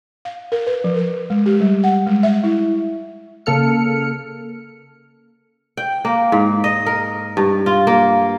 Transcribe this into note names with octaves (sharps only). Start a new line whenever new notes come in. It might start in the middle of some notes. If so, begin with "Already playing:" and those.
F5
A#4
B4
F3
A#4
G#3
G4
G3
F#5
G#3
E5
E4
C#3 A#3 A4 F6 C#7
G5
A#3
G#2
D#5
A#4
G2
F4
A#3